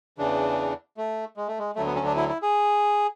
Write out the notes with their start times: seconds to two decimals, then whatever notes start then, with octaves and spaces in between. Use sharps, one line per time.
0.18 E2 C#3 E3 D4
0.97 A3
1.37 G#3
1.48 A3
1.59 G#3
1.76 D2 D3 F#3 A3
1.86 B3
1.96 C#4
2.05 D4
2.16 E4
2.29 E4
2.42 G#4